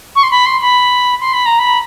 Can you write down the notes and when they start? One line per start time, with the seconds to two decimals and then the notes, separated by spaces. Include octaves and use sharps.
0.15 C#6
0.23 C6
0.31 B5
0.46 C6
0.61 B5
1.20 C6
1.33 B5
1.45 A#5
1.58 B5